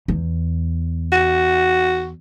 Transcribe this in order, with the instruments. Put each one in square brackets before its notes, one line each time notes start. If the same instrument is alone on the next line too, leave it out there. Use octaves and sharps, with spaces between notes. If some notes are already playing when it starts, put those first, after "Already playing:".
[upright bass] E2
[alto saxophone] F#4